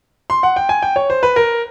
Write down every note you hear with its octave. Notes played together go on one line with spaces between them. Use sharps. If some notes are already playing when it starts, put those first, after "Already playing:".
C6
F#5
G5
G#5
G5
C#5
C5
B4
A#4